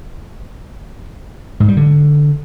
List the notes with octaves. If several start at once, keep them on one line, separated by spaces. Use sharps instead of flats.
G#2
G3
D3